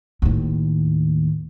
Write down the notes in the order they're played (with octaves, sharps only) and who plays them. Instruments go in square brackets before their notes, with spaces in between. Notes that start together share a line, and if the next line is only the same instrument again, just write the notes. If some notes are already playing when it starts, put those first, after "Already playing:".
[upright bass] D#2 A2